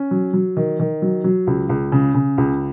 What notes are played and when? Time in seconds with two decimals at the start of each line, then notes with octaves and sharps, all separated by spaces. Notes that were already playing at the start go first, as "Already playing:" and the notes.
Already playing: C#4
0.11 F#3
0.33 F#3
0.57 D#3
0.79 D#3
1.02 F#3
1.24 F#3
1.47 C#2
1.69 C#2
1.92 C#3
2.14 C#3
2.38 C#2